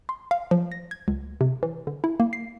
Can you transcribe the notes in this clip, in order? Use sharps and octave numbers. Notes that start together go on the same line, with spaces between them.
C6
F5
F3
A#6
G#6
C#2
C3
E3
D3
E4
A#3
C7